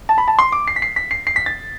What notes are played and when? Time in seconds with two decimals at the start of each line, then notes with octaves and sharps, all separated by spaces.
0.09 A5
0.18 B5
0.28 A5
0.39 C6
0.52 D6
0.68 C7
0.76 B6
0.82 C7
0.96 B6
1.11 C7
1.27 C7
1.36 B6
1.46 A6